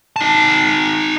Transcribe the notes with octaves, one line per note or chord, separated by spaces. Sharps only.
D#4 A5